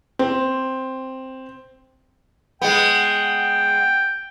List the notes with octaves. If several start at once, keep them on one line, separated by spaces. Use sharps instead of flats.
C4
G#3 B3 G5